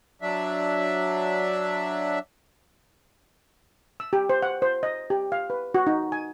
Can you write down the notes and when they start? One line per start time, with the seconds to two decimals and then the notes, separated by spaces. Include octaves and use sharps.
0.22 F#3 D4 E5
4.00 E6
4.13 G4
4.30 C5
4.43 F#5
4.62 C5
4.83 D#5
5.10 G4
5.32 F5
5.50 B4
5.75 F#4
5.87 D#4
6.12 G#5